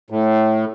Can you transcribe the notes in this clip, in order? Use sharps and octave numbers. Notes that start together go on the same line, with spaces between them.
A2